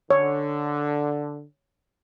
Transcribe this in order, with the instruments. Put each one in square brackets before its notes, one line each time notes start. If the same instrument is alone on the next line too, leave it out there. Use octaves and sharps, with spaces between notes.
[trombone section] D3 [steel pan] C#5